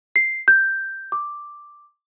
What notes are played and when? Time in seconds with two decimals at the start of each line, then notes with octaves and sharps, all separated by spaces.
0.16 C7
0.48 G6
1.12 D6